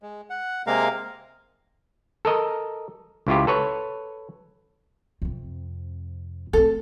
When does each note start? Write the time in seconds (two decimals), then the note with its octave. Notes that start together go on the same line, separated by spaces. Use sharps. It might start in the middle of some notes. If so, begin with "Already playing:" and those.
0.02 G#3
0.30 F#5
0.67 C3 G#3 A#3 A#4 F5
2.25 A4 A#4 D#5
3.27 C#2 E4 F4 G4
3.47 A4 B4 C#5
5.22 F2 C3
6.53 A3 C4 A4